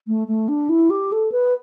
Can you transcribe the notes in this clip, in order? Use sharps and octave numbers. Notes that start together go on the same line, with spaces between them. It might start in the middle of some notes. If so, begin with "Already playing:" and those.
A3
A3
D4
E4
G4
A4
B4